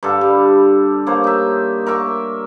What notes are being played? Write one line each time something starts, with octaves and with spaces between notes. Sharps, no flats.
G2 D3 A4 F5
G3
A#3 C5 C#5
D#4 E5
A#4 E5 C#6 D6